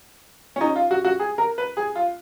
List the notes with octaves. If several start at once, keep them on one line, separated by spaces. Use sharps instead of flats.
C#4
D#4
F4
F#4
F#4
G#4
A#4
B4
G#4
F4